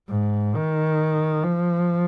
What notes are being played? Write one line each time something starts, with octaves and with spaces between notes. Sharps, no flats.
G#2
D#3
F3